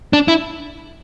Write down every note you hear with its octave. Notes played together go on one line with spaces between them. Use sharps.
D4
E4